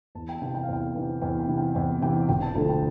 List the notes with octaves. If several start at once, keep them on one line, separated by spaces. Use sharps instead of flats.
E2 A5
G5
A5
C3 E3 G5
G5
F5
E2 G5
C3 E3
E2 G5
G5
C3 E3
G5
E2 G5
C3 E3 G5
E1 G5
A5
D2 D3 F3 A3 A5
G5